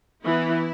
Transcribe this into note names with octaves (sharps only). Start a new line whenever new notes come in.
E3 B3 E4